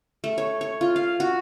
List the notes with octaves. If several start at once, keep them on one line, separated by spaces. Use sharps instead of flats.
A3
C#5
C#5
F4
F5
F#4